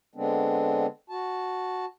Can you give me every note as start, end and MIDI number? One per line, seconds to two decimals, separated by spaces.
0.15 0.86 50
0.15 0.86 56
0.15 0.86 59
0.15 0.86 60
0.15 0.86 62
1.10 1.85 66
1.10 1.85 81